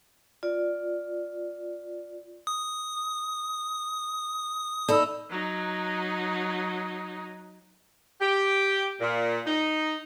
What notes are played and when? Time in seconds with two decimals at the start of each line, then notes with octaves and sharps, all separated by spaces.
0.43 F4 D5
2.47 D#6
4.89 D#4 A4 D5 B5 E6
5.30 F#3 D#4
8.21 G4
9.00 A#2
9.46 D#4